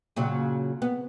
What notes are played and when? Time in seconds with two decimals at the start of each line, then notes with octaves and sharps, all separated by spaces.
0.16 A#2 C#3 F#3
0.82 B3